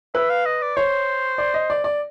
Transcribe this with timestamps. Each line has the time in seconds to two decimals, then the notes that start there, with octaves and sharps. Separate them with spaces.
0.15 B4 E5
0.30 F5
0.46 D#5
0.62 D5
0.77 C5 C#5
1.38 D5
1.54 D#5
1.70 D5
1.84 D5